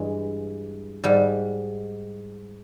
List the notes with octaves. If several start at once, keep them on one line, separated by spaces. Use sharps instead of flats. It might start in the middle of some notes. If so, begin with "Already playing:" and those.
Already playing: G2 E3 G#3
G#2 G3